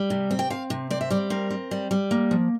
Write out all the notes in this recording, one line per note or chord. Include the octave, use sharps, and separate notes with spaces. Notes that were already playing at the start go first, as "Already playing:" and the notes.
Already playing: G3
C3
C4
G5
C4 F5
C3
C4 D5
E5
G3 D5
C4 A#4
C4
G3
G3
A#3
F3